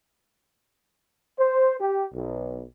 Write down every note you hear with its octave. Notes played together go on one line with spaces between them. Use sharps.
C5
G4
B1